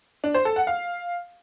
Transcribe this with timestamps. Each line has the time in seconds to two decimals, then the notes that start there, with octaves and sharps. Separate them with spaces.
0.24 D4
0.34 C5
0.45 A4
0.56 F#5
0.67 F5